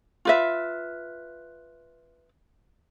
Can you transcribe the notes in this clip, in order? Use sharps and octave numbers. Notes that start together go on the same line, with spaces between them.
F4 B4 E5